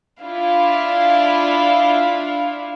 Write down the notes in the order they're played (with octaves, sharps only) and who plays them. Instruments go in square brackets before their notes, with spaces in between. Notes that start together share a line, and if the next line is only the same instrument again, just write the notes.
[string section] D4 E4 F4 [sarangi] F5